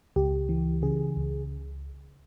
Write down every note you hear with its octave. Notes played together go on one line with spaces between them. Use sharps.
C#2 G4
E3
C#3 G#4
C#2